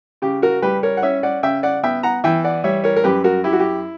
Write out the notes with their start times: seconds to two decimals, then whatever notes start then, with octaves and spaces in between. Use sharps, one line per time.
0.22 C#3 G4
0.42 F#4 A#4
0.62 G3 G4 B4
0.83 A#4 C#5
0.97 F#5
1.02 C#4 C#5 E5
1.23 D5 F#5
1.43 C#3 E5 G5
1.63 D5 F#5
1.84 B3 E5 G5
2.03 F#5 A#5
2.24 E3 E5 G5
2.44 D5 F#5
2.64 G3 C#5 E5
2.84 A#4 C#5
2.96 A#4
3.04 F#2 G4 B4
3.24 F#4 A#4
3.44 E4 G4
3.53 F#4
3.60 G4